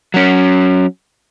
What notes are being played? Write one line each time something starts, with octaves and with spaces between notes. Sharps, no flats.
F#3 C#4